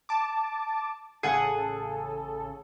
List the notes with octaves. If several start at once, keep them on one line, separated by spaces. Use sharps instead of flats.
A5 D6
A1 C#3 G#4 A4 F#5